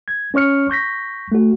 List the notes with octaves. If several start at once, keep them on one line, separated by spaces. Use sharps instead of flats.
G#6
C#4 C#5 C#6 F6 C#7
C#6 G6 A#6 B6
A3 F#4